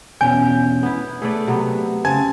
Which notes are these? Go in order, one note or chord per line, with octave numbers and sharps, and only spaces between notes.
E2 B2 C#4 D4 G#5 G6
B3 E4
A3 G#4 A4 B4 D5
C3 F#3 B3
C#3 C4 G#5 A5 G#6